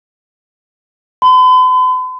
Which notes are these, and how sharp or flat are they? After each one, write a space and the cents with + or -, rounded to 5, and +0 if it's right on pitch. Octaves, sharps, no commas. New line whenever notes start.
B5 +45